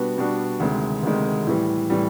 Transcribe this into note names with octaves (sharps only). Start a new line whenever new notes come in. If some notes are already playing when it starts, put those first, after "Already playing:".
Already playing: B2 G3 B3 D4 F#4
B2 G3 B3 D4 F#4
D2 C3 D#3 G#3
D2 C3 D#3 G#3
A2 E3 G3
A2 E3 G3